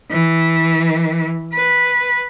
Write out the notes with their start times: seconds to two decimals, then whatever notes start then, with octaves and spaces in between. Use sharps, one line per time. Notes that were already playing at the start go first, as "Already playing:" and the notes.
0.11 E3
1.53 B4